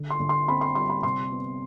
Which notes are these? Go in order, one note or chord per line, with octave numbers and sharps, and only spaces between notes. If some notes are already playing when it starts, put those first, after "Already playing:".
Already playing: D3
C6
D3
C6
C4 B5
C6
G3 C6
B5
C3 C6
B3